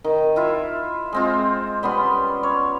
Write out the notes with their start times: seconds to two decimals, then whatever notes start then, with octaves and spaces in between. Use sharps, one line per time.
0.04 D#3
0.36 E4 F4 E5
1.12 G#3 C4 F4
1.83 G3 B3 C#4 C6
2.43 C#5